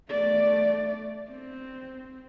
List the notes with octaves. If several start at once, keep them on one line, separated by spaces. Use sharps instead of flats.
A3 D5
C4